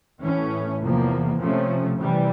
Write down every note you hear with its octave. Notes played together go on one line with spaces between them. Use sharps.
A2 E3 A3 C#4
E2 C3 F3 A#3
C3 F3 A3 C#4
C3 E3 G3